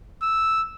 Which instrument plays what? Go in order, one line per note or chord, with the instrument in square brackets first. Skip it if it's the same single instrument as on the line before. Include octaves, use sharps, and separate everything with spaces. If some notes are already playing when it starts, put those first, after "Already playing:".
[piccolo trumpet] E6